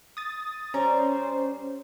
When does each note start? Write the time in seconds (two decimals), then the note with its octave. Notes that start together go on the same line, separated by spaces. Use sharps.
0.17 D#6 A6
0.74 G3 C#4 C5 C#5 A#5